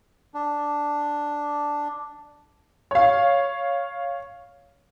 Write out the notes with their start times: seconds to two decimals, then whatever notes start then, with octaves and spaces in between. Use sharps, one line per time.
0.34 D4
2.91 C#5 F5